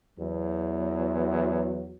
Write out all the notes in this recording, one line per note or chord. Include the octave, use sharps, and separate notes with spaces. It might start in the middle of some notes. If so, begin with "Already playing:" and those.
E2 F#3